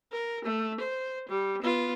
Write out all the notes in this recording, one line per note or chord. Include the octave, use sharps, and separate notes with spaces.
A#4
A3
C5
G3
B3 F4